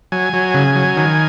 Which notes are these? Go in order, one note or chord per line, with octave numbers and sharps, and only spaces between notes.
F#3 G#5
F#3
C#3
F#3
D#3